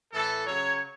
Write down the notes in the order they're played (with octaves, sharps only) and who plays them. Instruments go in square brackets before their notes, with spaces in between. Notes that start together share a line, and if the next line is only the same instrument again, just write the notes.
[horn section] A2 E3 A4
C#3 F#3 C#5